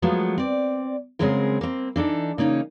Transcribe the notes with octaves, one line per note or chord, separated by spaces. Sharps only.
F3 F#3 G#3 A3 B3 F4
C4 D5
C#3 F#3 G#3 C4 G#4 A#4
A#3 C4
E3 D4 D#4 A4
C#3 A#3 C#4 D#4